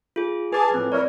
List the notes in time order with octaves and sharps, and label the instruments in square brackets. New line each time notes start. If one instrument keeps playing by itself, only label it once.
[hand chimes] F4 G#4
[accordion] G#4 G#5 A5 [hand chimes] B4 D6
[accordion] A2 F3 [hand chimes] C4
[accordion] E4 A#4 C#5 [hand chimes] D5